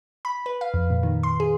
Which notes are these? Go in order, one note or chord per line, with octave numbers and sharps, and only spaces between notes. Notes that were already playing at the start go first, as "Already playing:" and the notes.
B5
B4
F5
F2
A#2
D#3
C6
G#4